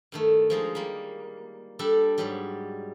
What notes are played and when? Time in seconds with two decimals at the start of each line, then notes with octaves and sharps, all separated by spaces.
0.12 G2 D#3 A3
0.50 F3 G#3 D#4 A#4
0.75 G3 A#3
1.79 G3 D4 A4
2.18 G#2 F#3 G3